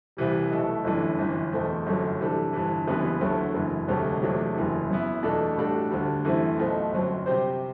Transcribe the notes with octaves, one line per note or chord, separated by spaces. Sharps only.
C2 C3 E3 G3
B1 B2 A3 E4 A4
G1 F#2 E3 A3 D4
G1 F#2 E3
E2 B2 A3 C4
G1 F#2 F#3 A3
C3 E3 G3 D4 A4
G1 G2 E3
F#1 F#2 E3 G3 B3
D2 D3 F#3 A3 E4
F#1 F#2 E3
E1 D2 C3 F#3 A3
E2 C3 F#3 A3 D4
F#1 F#2 E3
F#2 F#3 B3 E4
E2 B2 A3 D4 A4
A2 G3 D4 F#4 A4
D2 D3 G3
F#2 E3 A3 C4 E4
B1 B2 A3 C4
G1 F#2 F#3 C4
C3 G3 C4 G4 C5